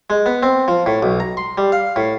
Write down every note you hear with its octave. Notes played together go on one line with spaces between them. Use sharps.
G#3
B3
C4
F3
A2
B1
A#5
C6
G3
F5
A2